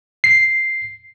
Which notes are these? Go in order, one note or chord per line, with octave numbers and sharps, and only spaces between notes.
C7